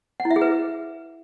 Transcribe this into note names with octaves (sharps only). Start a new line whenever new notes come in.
F#5
E4
E5
G#4
B4